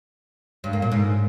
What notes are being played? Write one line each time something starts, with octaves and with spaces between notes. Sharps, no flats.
G2
A#3
A#2
G#2